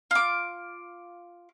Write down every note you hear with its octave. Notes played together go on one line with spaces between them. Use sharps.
F4 D6